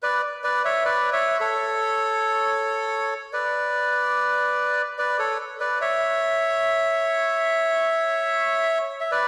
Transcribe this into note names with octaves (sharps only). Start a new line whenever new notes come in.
B4 D5
B4 D5
C#5 E5
B4 D5
C#5 E5
A4 C#5
B4 D5
B4 D5
A4 C#5
B4 D5
C#5 E5
E5
B4 D5